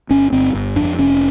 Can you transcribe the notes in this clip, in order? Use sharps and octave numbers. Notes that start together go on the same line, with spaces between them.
G1 C#4
G1 C4
G1
F2 D4
F1 C#4